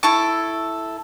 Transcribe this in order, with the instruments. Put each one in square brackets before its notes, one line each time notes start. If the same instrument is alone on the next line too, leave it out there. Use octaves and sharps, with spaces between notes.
[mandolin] E4 A4 C#6